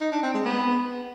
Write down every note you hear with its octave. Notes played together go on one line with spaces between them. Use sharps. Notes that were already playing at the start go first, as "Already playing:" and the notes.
D#4
D4
C4
G#3
B3